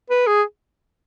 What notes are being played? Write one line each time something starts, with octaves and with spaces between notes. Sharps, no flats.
B4
G#4